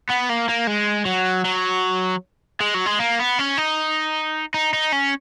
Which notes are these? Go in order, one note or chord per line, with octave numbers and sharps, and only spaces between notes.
B3
A#3
A#3
G#3
F#3
F#3
G#3
F#3
G#3
A#3
B3
C#4
D#4
D#4
D#4
C#4